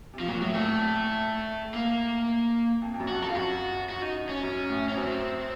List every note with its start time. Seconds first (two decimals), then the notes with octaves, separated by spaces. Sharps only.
0.14 C3
0.20 F3
0.28 A#2 F#3
0.41 A2 F#3
0.54 A#2 A3
0.67 A2
1.74 A#3
2.82 F2
2.94 F2
3.00 F#2
3.09 F#4
3.17 F#2
3.22 A4
3.30 F4
3.35 F#2 F#4
3.89 F#4
4.02 D#4
4.29 C#4
4.43 F#2
4.69 A2
4.89 C#4
4.97 F#2 C4